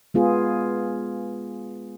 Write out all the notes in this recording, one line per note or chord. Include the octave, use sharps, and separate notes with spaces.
G#3 B3 F4 G#4